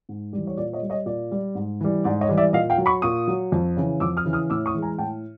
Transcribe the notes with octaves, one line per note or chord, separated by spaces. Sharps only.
G#2
E3 G3
C#5
A#2 D5
C#5 D#5
G3
C#5 D#5
A#2 D5
G3
G#2
E3 G3
G#2 D5
C#5 D#5
E3 G3
D5 E5
A#2 D#5 F5
F5 G5
F#3
B5 C#6
A#2 C#6 D#6
F#3
F2
C#3 E3
F2 D6 E6
D#6 F6
C#3 E3
D#6 F6
A2 D6 E6
C#6 D#6
E3 G#3
G#5 A#5
A2 G5 A5